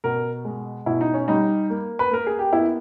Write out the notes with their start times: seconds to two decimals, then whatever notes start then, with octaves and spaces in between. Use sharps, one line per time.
0.04 B2 A#4
0.45 G#3
0.86 B2 E4
1.01 D#4
1.14 C#4
1.28 G3 D#4
1.70 A#3
1.99 B4
2.11 A#3 A#4
2.27 G#4
2.39 G4
2.52 B3 E4